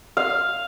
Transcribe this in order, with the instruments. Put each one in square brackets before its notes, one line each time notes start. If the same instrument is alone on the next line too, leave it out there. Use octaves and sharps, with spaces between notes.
[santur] F5